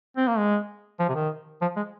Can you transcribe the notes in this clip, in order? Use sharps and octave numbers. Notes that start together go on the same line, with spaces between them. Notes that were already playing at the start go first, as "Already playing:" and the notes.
C4
A#3
G#3
F3
C3
D#3
F3
G#3